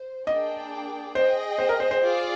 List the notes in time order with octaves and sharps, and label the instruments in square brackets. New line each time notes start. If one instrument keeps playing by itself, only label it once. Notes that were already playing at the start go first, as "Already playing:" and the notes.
Already playing: [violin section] C5
[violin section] A#3 D4 G#4 D5 G5 [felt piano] D#5
[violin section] G#4 D#5 G5 [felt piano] C5
[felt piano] C5
A#4
C5
C5
[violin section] F4 G#4 D5